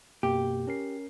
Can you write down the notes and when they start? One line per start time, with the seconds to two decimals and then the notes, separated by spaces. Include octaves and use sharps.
0.23 F#2 B2 A#3 G4
0.67 C#4 A#4 C7